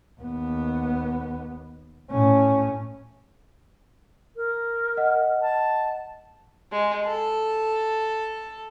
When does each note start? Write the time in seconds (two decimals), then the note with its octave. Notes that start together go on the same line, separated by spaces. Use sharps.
0.20 D#2 B3
2.11 A2 C#4
4.36 A#4
4.97 D#5 F#5
5.42 A5
6.72 G#3
7.06 A4